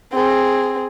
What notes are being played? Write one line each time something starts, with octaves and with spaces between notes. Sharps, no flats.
C4 G#4